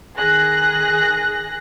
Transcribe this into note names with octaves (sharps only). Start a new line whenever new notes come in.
D#3 G#4 F#6 A#6